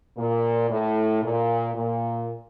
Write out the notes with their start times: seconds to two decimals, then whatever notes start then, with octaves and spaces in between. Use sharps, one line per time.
0.17 A#2
0.70 A2
1.23 A#2
1.74 A#2